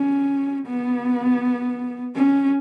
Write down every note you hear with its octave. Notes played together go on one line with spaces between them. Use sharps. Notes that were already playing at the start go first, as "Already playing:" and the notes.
Already playing: C#4
B3
C#4